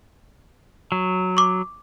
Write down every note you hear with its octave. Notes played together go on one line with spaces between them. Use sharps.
F#3
C#6 D6